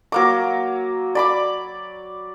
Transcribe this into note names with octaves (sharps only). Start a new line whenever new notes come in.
F#3 A#3 D6
D5 B5 D6